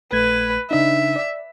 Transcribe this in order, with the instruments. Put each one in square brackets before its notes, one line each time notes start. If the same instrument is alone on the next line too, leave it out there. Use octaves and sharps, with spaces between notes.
[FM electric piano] A#1 A3 G#6 [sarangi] B4
[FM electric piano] C#3 D4 D#4 [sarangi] E5
[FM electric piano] D5